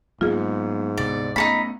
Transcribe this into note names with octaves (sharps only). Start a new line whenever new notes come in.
G#2 F#3 A#3 B3 F4 G#4
D2 C3 B3 D5
A3 B3 C#4 D#4 A4 B5